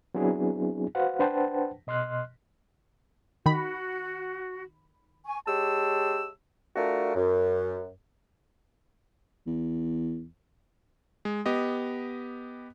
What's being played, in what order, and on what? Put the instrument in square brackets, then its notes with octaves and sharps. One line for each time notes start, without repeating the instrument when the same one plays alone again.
[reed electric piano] F#3 B3 C4 D4 E4 G#4
F#4 B4 C5 F5 F#5
D4 B4 C5 F#5 G5 A5
B2 D#5 C6 F6 F#6
[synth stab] D#3 B5 [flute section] F#4
[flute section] G#5 C#6
[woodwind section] G#3 G4 C#5 A5 E6
A3 D4 F4 F#4 A#4
F#2
[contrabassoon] E2
[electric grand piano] G#3
B3 G4 D#5